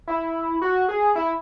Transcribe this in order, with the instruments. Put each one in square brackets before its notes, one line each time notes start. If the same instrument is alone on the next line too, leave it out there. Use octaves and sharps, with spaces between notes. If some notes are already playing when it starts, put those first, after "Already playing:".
[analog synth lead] E4
F#4
G#4
E4